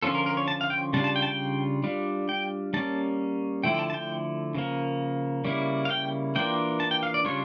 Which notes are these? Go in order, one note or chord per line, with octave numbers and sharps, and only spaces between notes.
D3 F3 C#4 F4 A4
A#4
A#4
C#5
A5
F5
G5
C#3 G3 D4 F4 A5
A5
G5
A5
G5
G3 D4 F4
G5
G3 A#3 C#4 A5
D3 F3 A3 E4 G5
G5
A5
A5
G5
C#3 F3 A#3
C#3 G3 A#3 E4
F5
G5
E3 A#3 D4 F4 G5
A5
G5
F5
D5
C#3 G3 D4 F4 C#5